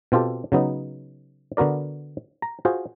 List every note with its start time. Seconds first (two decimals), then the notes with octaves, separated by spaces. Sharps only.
0.12 B2 C4 F4 G4 A4
0.52 C#3 F#3 B3 D#4
1.57 D3 B3 F#4 A#4 D5
2.42 A#5
2.65 F4 F#4 G#4 C5